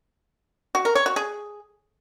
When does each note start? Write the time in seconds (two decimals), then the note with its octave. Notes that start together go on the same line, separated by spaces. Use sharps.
0.75 F#4
0.85 A#4
0.95 C#5
1.06 F#4
1.16 G#4